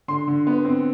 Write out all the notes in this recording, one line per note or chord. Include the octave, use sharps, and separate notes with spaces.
D3 C6
D3
B3
C4